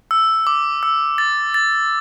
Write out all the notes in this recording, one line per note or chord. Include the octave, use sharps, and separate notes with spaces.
E6
D6
E6
A6
A6